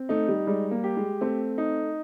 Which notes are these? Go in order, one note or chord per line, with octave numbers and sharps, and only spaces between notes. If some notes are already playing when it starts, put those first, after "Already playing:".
Already playing: C4
A3 D#4
G3
G3 G#3
A#3
G4
G#3
A3 C4
D#4